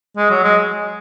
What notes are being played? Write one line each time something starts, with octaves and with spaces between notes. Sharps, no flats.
G#3
F#3
G#3